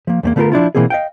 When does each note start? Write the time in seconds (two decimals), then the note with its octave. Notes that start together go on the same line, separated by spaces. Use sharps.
0.07 F3 A#3
0.23 E2 A3 A#3
0.36 D3 A3 B3 F4 A4 A#4
0.52 F3 D4 E4 F4
0.75 B2 E3 A#3 C4 G#4
0.90 D#5 F5 G5